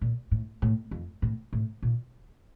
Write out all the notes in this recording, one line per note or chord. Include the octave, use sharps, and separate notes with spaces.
A#2
A2
A2
F2
A2
A2
A#2